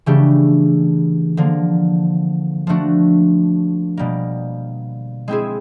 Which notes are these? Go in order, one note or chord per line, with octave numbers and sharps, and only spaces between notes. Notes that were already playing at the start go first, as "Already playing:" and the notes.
C#3 E3 A3 D4 G4
D3 F3 A#3
F3 A3 D4 F#4
B2 G3 A#3
G#3 C4 E4 G#4